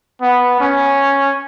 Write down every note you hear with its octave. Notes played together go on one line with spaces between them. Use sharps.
B3
C#4